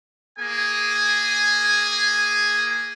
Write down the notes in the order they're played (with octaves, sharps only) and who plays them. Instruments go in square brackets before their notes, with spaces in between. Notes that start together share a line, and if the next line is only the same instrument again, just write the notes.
[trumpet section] A#3 G#4 G#5